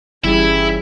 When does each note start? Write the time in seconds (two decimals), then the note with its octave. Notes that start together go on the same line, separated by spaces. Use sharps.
0.24 G1 E3 G3 C#4 E4 G#4